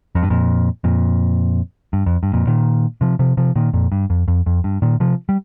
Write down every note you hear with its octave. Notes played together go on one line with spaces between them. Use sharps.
F2
G2
F2 A#2
F2 A#2
G2
F2
G2
F2 A#2
A#2 D#3
C3 F3
C3 F3
C3 F3
A#2 D#3
F2 A#2
G2
F2
F2
F2
G2
A#2 D#3
C3 F3
G3